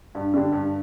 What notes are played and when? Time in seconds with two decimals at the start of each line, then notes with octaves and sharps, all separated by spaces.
0.15 G2
0.34 D3 G3 D4
0.52 G2